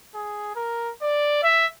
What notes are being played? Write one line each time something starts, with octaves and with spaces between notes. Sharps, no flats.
G#4
A#4
D5
E5